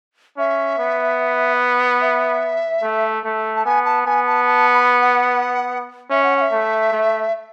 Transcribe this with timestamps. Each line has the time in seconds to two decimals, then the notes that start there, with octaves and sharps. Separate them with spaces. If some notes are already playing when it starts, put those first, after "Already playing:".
0.37 C#4 E5
0.78 B3
2.01 E5
2.83 A3
3.24 A3
3.56 A5
3.65 B3 G#5
3.85 A5
4.06 B3 G#5
4.27 A5
4.47 A5
4.74 B5
5.02 F#5
6.10 C#4 E5
6.23 F#5
6.37 F#5
6.41 E5
6.52 A3
6.93 A3